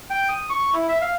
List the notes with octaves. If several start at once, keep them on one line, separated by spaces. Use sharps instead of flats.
G5
D#6
C#6
E4
E5
F5